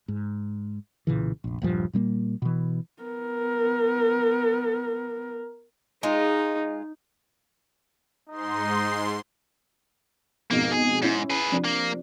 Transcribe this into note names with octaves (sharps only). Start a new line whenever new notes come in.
G#2
B1 A#2 C#3 E3
F1 A#1
D#1 A#1 G2 F3
A#2 G3 A3 A#3
B2 E3
B3 A#4
G#3 D#4 F4
G#2 D#4 C6
F2 G#2 B2 A#3
G#4
G#2 C#4 E4
G#4 B4
C3 F3 D4
A#3